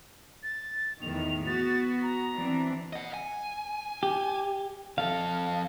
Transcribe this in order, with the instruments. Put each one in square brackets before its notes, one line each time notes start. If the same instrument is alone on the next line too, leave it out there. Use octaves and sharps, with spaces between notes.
[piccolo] A6
[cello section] E2 A2 D#3 [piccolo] F7
[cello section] B3 F#4 [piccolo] A6
[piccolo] A#5
[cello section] E3 C4 D4
[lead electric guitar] D#5 F#5
G#5
[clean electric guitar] G4
[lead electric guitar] F2 A4 [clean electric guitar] F5